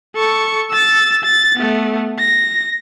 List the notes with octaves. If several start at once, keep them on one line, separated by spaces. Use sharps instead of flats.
A4 C#6
E6 A6
A6
A3 B3
A#6